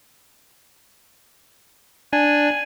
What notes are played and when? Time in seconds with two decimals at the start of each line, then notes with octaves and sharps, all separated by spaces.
2.13 D4 G#5